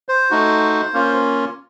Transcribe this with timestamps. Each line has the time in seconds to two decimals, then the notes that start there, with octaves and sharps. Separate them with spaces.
0.09 C5
0.30 A3 D#4 F#4
0.94 A#3 C#4 F4